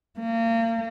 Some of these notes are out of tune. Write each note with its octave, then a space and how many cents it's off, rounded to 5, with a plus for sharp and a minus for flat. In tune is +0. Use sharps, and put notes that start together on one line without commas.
A#3 -35